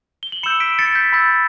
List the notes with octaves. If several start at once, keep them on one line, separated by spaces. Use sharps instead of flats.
G7
F#7
B5 E6 G6 C#7 E7
B6 D7
A6 C#7
G6 B6
B5 E6 G6 A6